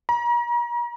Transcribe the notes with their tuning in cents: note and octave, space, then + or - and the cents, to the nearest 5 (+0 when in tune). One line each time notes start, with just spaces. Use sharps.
A#5 +40